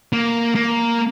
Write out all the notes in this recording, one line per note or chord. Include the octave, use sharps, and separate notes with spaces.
A#3
A#3